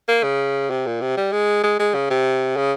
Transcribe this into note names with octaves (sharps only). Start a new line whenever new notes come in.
A#3
C#3
C3
A#2
C3
G3
G#3
G#3
G#3
C#3
C3
C#3